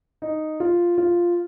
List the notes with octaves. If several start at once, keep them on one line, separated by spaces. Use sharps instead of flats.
D#4
F4
F4